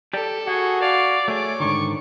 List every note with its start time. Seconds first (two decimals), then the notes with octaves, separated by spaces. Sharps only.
0.13 G4 A4 D5
0.48 F#4 G#4 F#5
0.81 D5 F5
1.28 A3 G#4 C#5 D6
1.60 G#2 D3 D#3 C#6